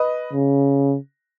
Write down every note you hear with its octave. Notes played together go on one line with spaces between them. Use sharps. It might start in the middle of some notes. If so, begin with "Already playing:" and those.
Already playing: B4 D#5
C#3